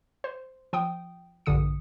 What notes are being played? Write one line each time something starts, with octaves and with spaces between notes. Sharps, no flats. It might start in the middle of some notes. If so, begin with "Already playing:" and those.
C5
F3 G5 D#6
A#1 G2 D3 D#6 C#7